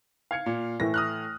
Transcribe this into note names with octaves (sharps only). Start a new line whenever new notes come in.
F5 G#6 C#7
A#2
A2 E3 A3 A#6
D#6 F6 F#6